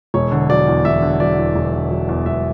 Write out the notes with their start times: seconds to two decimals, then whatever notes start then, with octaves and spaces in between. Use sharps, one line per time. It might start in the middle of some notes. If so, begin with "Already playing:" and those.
0.14 E1 C#5
0.32 D3
0.50 F#3 D5
0.67 E2
0.85 E1 E5
1.02 D3
1.20 F#3 D5
1.38 E2
1.56 E1
1.74 D3
1.91 F#3
2.09 E2
2.26 E1 E5